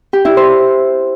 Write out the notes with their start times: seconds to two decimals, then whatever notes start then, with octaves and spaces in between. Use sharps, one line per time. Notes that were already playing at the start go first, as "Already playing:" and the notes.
0.13 G4
0.25 E4
0.37 C5